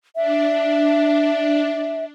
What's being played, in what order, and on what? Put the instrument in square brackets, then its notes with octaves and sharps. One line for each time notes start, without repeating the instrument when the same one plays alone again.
[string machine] D4 [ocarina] E5